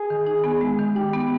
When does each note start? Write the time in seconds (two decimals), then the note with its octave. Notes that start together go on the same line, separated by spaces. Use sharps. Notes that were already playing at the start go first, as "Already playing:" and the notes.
Already playing: G#4
0.10 D#3
0.27 D#4
0.44 B3
0.61 G#3
0.79 D#3
0.95 D#4 G4
1.13 B3